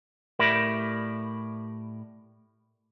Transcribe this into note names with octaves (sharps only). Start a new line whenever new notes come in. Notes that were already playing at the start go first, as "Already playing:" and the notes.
A2 G4 A#4 D5 E5 B5